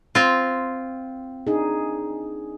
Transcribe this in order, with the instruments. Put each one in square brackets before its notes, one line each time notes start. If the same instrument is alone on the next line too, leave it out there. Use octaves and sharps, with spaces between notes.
[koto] C4 F4
[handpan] D4 D#4 G#4